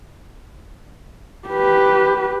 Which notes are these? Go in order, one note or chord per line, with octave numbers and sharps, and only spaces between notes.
G4 B4